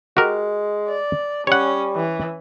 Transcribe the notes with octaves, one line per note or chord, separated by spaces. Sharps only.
G#3 F#4 G4 A#4
D5
G3 C#4 C#5 F#5
E3